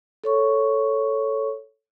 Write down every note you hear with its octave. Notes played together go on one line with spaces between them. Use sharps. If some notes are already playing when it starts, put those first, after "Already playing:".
A4 C#5 C#6